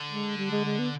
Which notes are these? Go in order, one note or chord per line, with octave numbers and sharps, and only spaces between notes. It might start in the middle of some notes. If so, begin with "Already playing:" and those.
Already playing: D3
G#3
G3
G#3
G#3
B3